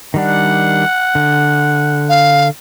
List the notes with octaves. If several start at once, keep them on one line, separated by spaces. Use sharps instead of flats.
D#3 G3 D4 F#5
D3
F5